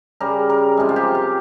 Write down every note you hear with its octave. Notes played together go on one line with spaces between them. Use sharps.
C#3 G3 A#4
A#4
C3 F3 G#3
F4
G4
F4